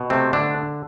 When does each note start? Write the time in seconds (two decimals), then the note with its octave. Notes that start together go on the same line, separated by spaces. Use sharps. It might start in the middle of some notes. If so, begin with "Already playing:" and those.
Already playing: B2
0.10 C3 A3 C4
0.33 D3 D4